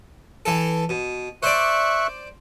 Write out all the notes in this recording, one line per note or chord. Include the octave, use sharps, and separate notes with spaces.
E3 A4
B2
C5 D5 E5 C#6 F#6